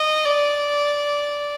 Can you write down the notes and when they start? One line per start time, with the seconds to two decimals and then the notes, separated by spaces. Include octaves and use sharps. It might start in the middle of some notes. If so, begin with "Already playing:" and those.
Already playing: D#5
0.25 D5